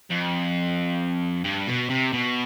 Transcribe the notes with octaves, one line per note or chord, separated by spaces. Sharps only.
F2
G2
B2
C3
B2